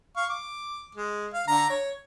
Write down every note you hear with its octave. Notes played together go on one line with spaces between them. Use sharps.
F5 C#6
D6
G#3
F5
D3 A#5
C#5